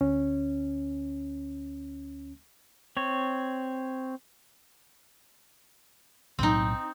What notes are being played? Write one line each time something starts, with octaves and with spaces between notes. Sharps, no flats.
D2 C#4
C4 C#5
B1 A2 F#3 C4 D#4